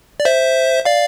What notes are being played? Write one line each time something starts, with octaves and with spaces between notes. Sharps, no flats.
D5
C5 E5
D5 F5